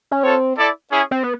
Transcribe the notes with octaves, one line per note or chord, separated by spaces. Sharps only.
C#4
C4 F4 A4 C#5
E4 A4 D5
C#4 E4 G#4
C4
B3